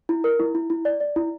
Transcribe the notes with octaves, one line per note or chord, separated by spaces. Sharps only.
E4
A#4
E4
E4
E4
D5
D5
E4